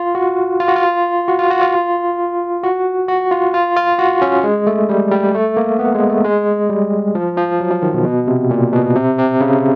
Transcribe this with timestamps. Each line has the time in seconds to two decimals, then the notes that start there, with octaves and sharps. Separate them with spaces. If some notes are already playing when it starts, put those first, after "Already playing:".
Already playing: F4
0.15 F#4
0.60 F4
0.68 F#4
0.76 F4
1.28 F#4
1.39 F4
1.50 F#4
1.61 F4
2.63 F#4
3.08 F#4
3.31 F4
3.54 F4
3.76 F4
3.99 F#4
4.22 C#4
4.44 G#3
4.67 A3
4.89 G3
5.11 G3
5.34 A3
5.57 A#3
5.79 B3
5.94 G#3
6.10 A3
6.24 G#3
6.70 G3
7.15 F3
7.37 F3
7.60 F#3
7.71 F3
7.82 D#3
7.94 B2
8.05 B2
8.27 C3
8.51 A#2
8.73 B2
8.96 C3
9.18 C3
9.41 C#3